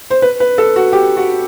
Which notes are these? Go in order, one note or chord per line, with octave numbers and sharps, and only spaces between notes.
C5
B4
B4
A4
F#4
G4
F#4